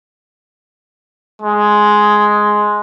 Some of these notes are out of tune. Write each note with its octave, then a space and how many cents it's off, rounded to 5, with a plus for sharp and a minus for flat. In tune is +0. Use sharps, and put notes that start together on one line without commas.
G#3 +5